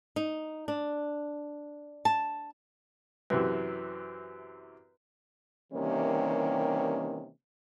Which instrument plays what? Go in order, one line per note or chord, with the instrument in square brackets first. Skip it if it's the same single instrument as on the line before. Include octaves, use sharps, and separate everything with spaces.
[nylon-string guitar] D#4
D4
A5
[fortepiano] F#2 C3 E3 [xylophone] B4
[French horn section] C3 D#3 E3 G3 A#3 C#4